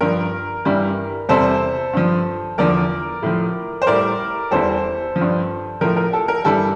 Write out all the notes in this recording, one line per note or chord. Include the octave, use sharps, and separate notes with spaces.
G2 F3 A#4
G2 E3 G3
E2 C3 G3 A4 C5
G2 F3
E2 D3 F3 A#4 D5
A2 F3
C5
A2 G3 A#4 D5
E2 E3 G3 A4 C5
F3
G2
A2 F3 A#4
A#4
A4
A#4
G2 E3 G3 A4